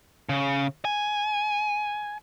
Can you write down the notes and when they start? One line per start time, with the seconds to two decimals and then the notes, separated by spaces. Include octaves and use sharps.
0.29 C#3
0.85 G#5